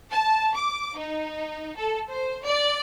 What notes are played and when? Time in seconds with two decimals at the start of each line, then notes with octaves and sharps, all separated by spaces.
0.10 A5
0.54 D6
0.96 D#4
1.75 A4
2.09 C5
2.44 D5